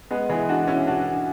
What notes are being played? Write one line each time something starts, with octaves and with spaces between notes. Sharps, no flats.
G#3 B3
E3 G#3
D4 F#4
C#4 E4
D4 F#4